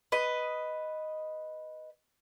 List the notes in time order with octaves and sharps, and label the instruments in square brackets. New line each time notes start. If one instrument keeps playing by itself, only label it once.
[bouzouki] B4 D#5